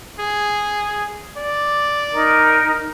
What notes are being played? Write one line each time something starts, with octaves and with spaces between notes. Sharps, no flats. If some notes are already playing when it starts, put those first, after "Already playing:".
G#4
D5
D#4 A#4